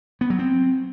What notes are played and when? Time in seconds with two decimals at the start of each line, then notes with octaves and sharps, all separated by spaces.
0.21 B3
0.30 F#3
0.39 C4